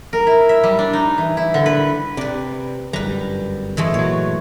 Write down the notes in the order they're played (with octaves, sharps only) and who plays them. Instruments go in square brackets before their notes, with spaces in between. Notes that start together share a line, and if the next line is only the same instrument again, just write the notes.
[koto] A#4
E4
E5
G3
D4
D#4
E3
E4
D3
B4
[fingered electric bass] C3 [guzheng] B4 D5
[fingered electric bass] G1 F#2 G3 [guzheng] B4 A#5
[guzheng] E3 G#3 A3
[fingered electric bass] A#2 F#3 [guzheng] C#5